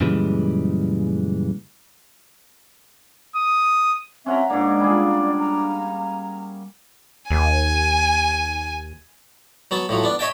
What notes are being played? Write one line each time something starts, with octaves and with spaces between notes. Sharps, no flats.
F#2 A#2 C#3 E3 G3 G#3
D#6
C4 C#4 E5 F#5 A#5
G#2 A#3 D4 D5
G3 F4 G#4
A#5
D#2 G#5
F#3 B3 A5
A2 F3 F#3
B3 D4
C#5 D#5 E5 G5 A5